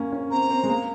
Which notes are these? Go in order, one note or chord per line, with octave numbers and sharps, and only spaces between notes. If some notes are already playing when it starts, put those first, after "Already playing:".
Already playing: A#3 C#4
C#4
C4 A#5
C4
G#3
A#3